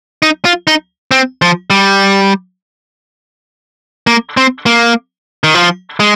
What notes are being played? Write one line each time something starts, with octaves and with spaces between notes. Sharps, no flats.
D#4
F4
D#4
C4
F3
G3
A#3
C4
A#3
D#3
F3
G#3